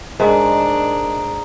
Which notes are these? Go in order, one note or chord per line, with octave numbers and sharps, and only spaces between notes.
G#2 D4 D#4 A#4 D#5 C6